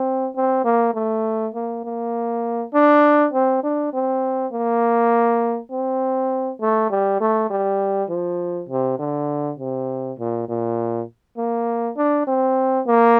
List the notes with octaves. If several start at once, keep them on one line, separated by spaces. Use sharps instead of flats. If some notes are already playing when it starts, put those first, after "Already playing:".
Already playing: C4
C4
A#3
A3
A#3
A#3
D4
C4
D4
C4
A#3
C4
A3
G3
A3
G3
F3
C3
D3
C3
A#2
A#2
A#3
D4
C4
A#3